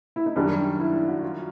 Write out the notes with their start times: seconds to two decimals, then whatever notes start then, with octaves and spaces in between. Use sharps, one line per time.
0.16 E4
0.26 D#4
0.36 F#2 D#3 G3 D4
0.80 E4
0.94 E4
1.08 F#4
1.22 F4